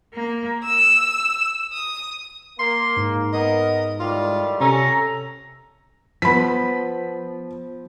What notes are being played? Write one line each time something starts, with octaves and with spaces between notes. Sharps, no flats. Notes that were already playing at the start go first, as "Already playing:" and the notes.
A#3
E6
D#6
A#3 C6
G#2
B3 A#4 D#5
A2 D#3 G3 F4
C3 C#4 A4 A#5
F3 B3 B5 B6